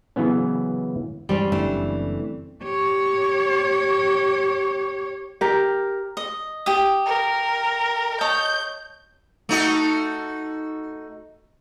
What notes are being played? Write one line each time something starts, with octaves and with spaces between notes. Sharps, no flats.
C#3 E3 F#3 B3 C#4
G2 E3 G3 G#3 C4 C#4
F#1 E3 A3 D4
G4 C#5
G4 A#4
D#5
G4 D#6
A#4
C#5 D#5 A5 G6
A3 D#4 F#4